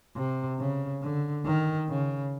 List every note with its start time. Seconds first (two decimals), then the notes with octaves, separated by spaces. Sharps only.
0.16 C3
0.59 C#3
1.02 D3
1.46 D#3
1.89 C#3